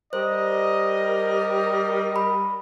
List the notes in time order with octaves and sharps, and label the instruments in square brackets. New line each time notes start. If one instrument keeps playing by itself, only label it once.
[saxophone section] G3 A#4 [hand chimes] C5 [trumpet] D#5
[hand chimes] B5